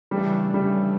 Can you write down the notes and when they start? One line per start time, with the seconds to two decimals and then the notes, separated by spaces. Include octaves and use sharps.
0.11 C#3 E3 G3 A3 D4
0.54 G3